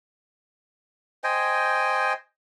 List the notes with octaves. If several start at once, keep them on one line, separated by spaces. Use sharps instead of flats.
C5 D#5 G5 G#5